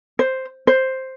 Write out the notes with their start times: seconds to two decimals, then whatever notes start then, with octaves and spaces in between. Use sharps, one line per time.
0.19 C5
0.67 C5